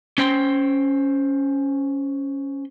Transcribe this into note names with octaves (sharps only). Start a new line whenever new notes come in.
C#4 C5 G5 C6